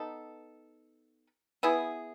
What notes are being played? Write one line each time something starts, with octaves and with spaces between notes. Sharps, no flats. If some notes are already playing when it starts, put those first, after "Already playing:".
Already playing: B3 D#4 A4
B3 E4 G#4